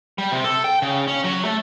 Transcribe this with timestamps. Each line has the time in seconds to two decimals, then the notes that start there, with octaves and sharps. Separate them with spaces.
0.18 G3
0.32 C3
0.44 A4
0.64 G5
0.82 C#3
1.08 C#4
1.24 F#3
1.45 A3